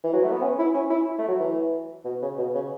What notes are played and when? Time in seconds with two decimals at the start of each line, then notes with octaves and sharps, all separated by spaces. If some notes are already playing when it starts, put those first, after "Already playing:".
0.04 E3
0.13 F#3
0.24 A3
0.32 B3
0.42 C#4
0.58 E4
0.74 C#4
0.90 E4
1.18 A3
1.28 F#3
1.40 E3
2.05 B2
2.22 C#3
2.38 B2
2.54 C#3